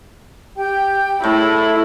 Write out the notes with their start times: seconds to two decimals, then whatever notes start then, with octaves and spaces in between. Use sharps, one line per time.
0.57 G4 G5
1.24 A2 E4 A5 B5